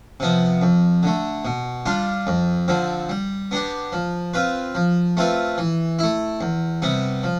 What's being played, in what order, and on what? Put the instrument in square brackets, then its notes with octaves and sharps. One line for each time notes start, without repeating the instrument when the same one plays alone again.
[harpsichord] C3 F3 B3
F2
D3 A3
B2
G3 D4 F4
F2
D3 F3 C4
G3
B3 D4 G4
F3
C4 F4 B4
F3
A3 C4 F4 B4
E3
A3 E4
E2
C3 G3 B3
F3